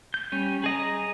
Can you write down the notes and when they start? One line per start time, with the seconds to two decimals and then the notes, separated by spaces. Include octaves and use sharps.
0.14 G6
0.32 G3 C#4
0.64 G#4 D#5 A#5